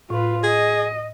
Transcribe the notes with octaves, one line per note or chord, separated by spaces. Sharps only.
A2 F4 B4
G#4 D#5